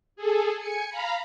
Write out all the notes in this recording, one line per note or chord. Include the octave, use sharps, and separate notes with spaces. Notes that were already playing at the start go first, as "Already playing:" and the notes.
G#4 A4
G#5 C#7
F5 A#5 B5